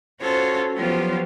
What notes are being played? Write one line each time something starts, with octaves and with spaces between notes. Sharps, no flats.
C#4 F4 F#4 A4 C5 C#5
F3 F#3 B3 F4 G4 C5